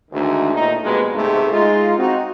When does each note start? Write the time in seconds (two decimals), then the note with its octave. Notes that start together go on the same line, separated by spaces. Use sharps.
0.11 D2 G#2 D#3
0.54 D#2 A#2 A3 D#4
0.83 F2 B2 G3 G#3 A#3 B4
1.13 B1 G#2 C3 G#3 A3
1.50 G#3 D#4 F4
1.97 C4 D#4 F#4